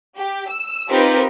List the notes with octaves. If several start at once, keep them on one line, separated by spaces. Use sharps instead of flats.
G4
E6
C4 D#4 F4 G4 A#4 B4